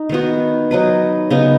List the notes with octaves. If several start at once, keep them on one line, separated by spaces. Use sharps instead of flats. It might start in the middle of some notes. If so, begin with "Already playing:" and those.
Already playing: D#4
D#3 B3 F#4
F#3 D#4 B4
C#3 B3 D#4